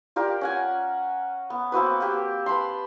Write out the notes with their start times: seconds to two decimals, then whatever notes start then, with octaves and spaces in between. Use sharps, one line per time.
0.16 F4 G4 A#4 D5
0.41 C#4 F#5 G#5
1.50 B3
1.72 A#3 C4 F#4 B4
2.00 A#3 G4
2.46 B4 A5 B5 C6